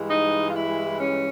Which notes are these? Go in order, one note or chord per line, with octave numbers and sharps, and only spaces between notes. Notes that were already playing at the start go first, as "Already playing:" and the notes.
Already playing: G2 E3 G#3
D#4
F4
E4
C#4